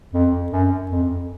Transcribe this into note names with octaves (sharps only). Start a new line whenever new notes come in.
F2
F#2
F2